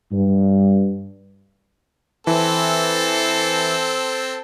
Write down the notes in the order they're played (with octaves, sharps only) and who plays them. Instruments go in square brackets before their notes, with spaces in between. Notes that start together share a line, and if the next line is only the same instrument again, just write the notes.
[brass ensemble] G2
[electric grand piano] E3 [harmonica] C4 A4